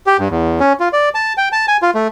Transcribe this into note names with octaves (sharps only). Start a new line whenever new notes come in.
G4
G2
E2
C#4
F4
D5
A5
G5
A5
G#5
F4
A3